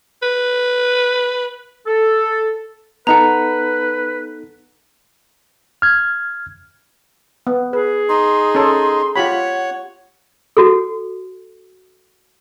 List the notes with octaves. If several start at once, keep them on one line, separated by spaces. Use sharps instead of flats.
B4
A4
B3 D#4 A4 B4 F#5 A#5
F6 G#6
B3
G#4 B4
D#4 C6
C#4 A4
F4 G4 C#5 F#5 B5
F#4 A4